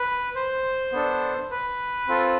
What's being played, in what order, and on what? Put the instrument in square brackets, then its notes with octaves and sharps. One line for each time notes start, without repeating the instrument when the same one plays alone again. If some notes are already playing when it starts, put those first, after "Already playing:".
Already playing: [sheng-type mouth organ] B4
C5
B3 D4 A4
B4
C4 F4 A4